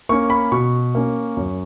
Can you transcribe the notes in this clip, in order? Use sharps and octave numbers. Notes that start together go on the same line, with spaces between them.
A#3 C#4 C#6
B5
B2 C#6
A#3 C#4
F#2